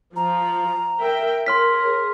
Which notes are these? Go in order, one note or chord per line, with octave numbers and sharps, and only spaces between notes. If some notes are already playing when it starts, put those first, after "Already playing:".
F3 A#5
A#4 E5 G5
G#4 A#4 C#5 C6 F6 B6